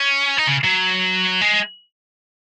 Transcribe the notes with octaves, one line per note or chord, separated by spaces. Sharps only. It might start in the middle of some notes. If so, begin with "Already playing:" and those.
Already playing: C#4
D#4
C#3
F#3
G#3